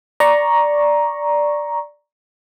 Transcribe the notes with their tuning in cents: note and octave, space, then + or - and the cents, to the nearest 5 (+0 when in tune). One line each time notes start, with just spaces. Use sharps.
D5 +0 A#5 +10 C#6 -5